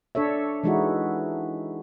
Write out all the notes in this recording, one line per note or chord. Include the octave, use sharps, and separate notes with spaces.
D4 A4 C#5 E5
E3 G#3 D#4 E4 F#4